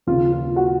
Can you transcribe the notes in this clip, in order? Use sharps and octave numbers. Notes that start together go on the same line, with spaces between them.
D#2 C#3 F4
F4
F#4